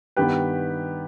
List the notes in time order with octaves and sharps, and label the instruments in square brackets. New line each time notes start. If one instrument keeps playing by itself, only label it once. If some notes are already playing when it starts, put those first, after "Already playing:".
[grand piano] G2 D#3 B3 G4 B4